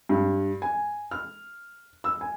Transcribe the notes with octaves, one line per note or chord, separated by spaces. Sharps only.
G2
G#5
F6
E6
G#5